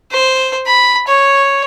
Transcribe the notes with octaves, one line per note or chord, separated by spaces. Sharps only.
C5
B5
C#5